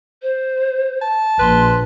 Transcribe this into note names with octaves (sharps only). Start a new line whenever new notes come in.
C5
A5
A#1 B4 C6